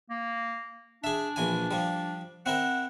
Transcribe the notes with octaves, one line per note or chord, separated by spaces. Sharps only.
A#3
D4 G#4 E5
A#1 E3 G#5
F3 G3
C4 E4 A#4 F#5